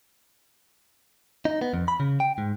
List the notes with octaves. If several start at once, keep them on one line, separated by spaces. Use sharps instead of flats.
D#4
B3
F2
B5
C#3
G5
G#2